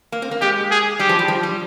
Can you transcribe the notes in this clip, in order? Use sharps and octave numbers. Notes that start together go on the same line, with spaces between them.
A#3
C4
A#3
G#3 G4
G#4
G3 G4
F3
G3
F3
G3